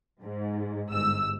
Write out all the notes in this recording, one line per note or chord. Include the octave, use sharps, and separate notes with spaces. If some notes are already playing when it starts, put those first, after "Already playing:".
G#2
G1 G#2 E6